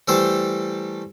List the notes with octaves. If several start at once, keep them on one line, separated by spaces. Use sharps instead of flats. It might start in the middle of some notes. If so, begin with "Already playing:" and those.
E3 G3 A3 G4 A4 C5